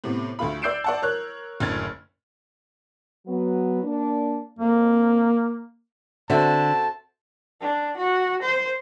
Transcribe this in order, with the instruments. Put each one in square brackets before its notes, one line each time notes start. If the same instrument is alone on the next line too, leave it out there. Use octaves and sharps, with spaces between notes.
[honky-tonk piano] A2 C3 B3
D2 A3 F4 B5
D5 E6 G6 C7 D7 E7
D5 F#5 A5
A#4 C#5 F#6
F#1 D2 A2 F6 G#6 A6
[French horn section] F#3 B3
A#3 D4
[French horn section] F2 [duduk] A#3
[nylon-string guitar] D3 [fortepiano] C4 F#4 E5 [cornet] A5
[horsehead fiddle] D4
F#4
C5